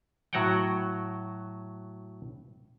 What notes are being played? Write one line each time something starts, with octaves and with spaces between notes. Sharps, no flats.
A2 F#3 F#4 C#5 F#5 G5